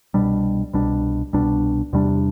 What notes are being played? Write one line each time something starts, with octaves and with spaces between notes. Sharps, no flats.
C2 B2 G3 D4
C2 B2 G3 D4
C2 B2 G3 D4
E2 C3 G3 D4